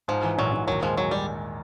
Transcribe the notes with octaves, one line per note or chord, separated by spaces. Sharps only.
G#2 F3
E3
A#1 F#3
A#1
D#2 F#3
F3 G#3
F#3 G#3
G3